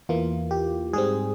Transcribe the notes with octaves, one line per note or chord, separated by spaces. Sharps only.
E2 E3 A#3 F4
G4
G#2 G3 C4 G#4